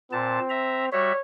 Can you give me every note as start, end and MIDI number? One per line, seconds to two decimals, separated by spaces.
0.12 0.39 46
0.12 0.90 60
0.12 0.39 81
0.50 0.85 76
0.50 0.85 82
0.92 1.12 55
0.92 1.12 66
0.92 1.21 73
0.92 1.12 76